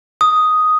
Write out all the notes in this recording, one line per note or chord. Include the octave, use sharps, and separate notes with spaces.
D#6